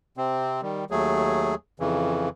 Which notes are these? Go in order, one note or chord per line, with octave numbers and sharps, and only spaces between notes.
C3 C4
D#3 G3
D#2 F#3 A3 G#4
F2 C#3 E3